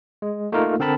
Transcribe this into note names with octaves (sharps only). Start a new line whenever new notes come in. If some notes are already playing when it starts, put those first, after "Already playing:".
G#3
A3 A#3 D#4 F4 A#4
D3 C4 A#4 A5 B5